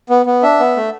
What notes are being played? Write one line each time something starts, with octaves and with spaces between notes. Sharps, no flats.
B3
B3
D4 E5
B3
A3